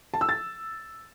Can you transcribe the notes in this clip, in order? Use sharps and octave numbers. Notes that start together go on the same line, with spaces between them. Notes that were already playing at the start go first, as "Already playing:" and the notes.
A5
E6
A6